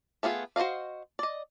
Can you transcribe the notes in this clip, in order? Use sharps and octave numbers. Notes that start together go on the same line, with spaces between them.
A3 B3 F4 G#4
F#4 C5 D5 D#5 F5
D5 D#5